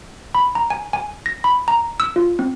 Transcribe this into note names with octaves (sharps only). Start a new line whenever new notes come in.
B5
A#5
G#5
G#5
A#6
B5
A#5
E6
F4
C4